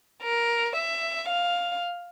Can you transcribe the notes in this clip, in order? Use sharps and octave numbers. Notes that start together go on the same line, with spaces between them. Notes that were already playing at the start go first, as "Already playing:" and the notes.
A#4
E5
F5